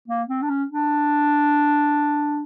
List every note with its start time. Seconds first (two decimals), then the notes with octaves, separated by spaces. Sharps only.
0.08 A#3
0.29 C4
0.42 D4
0.49 C#4
0.70 D4